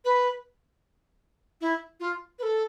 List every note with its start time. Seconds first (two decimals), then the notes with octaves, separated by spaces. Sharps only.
0.05 B4
1.61 E4
2.00 F4
2.39 B4
2.43 A4